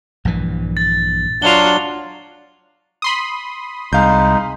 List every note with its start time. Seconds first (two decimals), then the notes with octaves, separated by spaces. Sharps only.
0.25 A#1 G2 E3
0.77 A6
1.42 F#3 D4 F4 F#4 F7 G7
3.02 B5 C6 D#6
3.93 C2 G#3 D#4 F5 G6